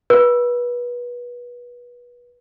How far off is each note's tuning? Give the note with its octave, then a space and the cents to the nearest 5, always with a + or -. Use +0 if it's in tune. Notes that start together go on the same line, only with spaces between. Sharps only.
B4 -25